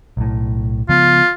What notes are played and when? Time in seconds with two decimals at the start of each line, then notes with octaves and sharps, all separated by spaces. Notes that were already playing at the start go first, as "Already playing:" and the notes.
0.17 B1 A2
0.89 C#3 F3 B3 F4